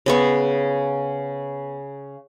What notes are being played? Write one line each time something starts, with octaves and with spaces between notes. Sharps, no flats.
C#3 B3 C#6